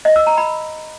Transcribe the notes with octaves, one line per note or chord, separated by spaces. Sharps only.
D#5
E6
A#5
B5